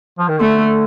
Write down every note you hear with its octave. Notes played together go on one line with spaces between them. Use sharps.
F3
D#3
D3 A3